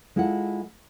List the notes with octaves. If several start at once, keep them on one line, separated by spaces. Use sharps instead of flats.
G#3 E4 F4 A4 F#5